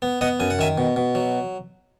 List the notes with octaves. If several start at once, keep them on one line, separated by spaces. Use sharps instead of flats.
B3
B3 D#5 F#5
F#2 G#5
F#5
D#3 E5 G#5
B2
B2
F#3